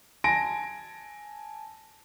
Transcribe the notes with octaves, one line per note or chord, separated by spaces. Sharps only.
G#5 A5 A#6 D7